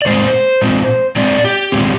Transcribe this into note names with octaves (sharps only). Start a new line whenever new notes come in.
D5
A#2 G#3 C4 C5
A#2 G#3 C4
A#2 G#3 C4 D5
G4
A#2 G#3 C4